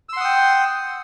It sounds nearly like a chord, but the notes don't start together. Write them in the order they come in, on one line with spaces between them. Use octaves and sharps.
E6 C6 F#5 D#6 G5